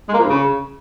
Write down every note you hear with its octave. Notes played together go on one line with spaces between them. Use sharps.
G#3
A#3
F3
G2
C#3